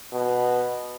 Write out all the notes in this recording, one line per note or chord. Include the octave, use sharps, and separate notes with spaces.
B2